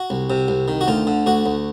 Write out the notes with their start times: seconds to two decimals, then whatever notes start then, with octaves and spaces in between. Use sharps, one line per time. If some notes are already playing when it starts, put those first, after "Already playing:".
Already playing: F#4
0.10 C2
0.30 C3
0.48 C2
0.68 D#3
0.81 F#4
0.88 D2 F4
1.07 D3
1.26 D2 F#4
1.46 D2